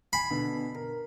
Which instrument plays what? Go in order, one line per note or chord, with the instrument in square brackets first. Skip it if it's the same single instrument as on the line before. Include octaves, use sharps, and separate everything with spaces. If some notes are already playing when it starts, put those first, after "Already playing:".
[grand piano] G#5 C7 [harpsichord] B5
[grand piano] B2 D3
A#4